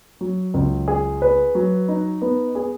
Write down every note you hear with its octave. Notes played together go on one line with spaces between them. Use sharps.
F#3
C#2
G#4
B4
F#3
D#4
B3
G#4